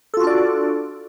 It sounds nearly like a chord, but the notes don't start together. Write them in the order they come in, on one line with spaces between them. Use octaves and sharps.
A4 F4 F#4 D4 D5